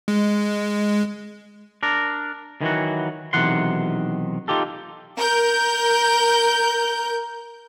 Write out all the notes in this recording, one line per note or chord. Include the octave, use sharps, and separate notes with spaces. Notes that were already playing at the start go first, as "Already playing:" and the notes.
G#3
D4 A#4
D#3 E3 F#3 F#4
B1 C3 D#3 E3 F#5 C6
D#4 F4 G4 A4
A#4 G6